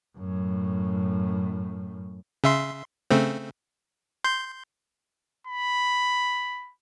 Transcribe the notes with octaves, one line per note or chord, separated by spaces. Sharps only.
F#2 A2
C#3 E5 C6
C#3 A3 C4
C6 G6
B5